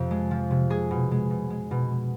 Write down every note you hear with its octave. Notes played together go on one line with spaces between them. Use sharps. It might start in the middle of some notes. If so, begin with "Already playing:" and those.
Already playing: F2 C3 F3
G#3
F3
C3
G#3 G#4
B2
G#3
B2
G#3
B2
G#3